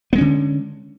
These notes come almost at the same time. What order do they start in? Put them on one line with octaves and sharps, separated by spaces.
B3 G#3 C#4 D3